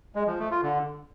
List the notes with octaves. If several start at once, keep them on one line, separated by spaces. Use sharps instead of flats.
G#3
F3
A3
F4
D3